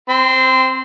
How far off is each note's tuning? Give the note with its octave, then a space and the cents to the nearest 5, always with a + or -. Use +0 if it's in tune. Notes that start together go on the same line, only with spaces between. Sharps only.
C4 +0 C6 -25